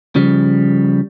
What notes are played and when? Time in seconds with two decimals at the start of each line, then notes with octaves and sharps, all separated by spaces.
0.15 C#3 F3 G3